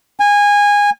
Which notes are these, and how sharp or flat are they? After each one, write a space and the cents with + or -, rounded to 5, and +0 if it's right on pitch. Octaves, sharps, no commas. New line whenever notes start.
G#5 -20